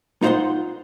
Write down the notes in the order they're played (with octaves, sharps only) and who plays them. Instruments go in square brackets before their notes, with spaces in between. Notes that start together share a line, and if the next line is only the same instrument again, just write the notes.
[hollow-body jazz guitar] D#4 F4 C5 D5 F#5 C6